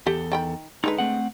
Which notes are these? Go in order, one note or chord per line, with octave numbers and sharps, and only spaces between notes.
E2 G4 A4
D#3 G5 B5
D3 G#3 D#4 B4
A3 C4 F#5